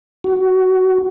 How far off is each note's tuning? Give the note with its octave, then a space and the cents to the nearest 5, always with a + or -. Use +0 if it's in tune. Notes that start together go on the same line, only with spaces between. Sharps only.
F#4 +15